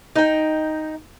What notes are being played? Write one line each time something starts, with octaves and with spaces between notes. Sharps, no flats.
D#4 G5